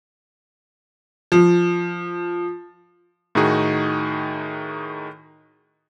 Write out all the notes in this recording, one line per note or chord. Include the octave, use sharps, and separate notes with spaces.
F3
A2 D#3 D#4 F#4 G#4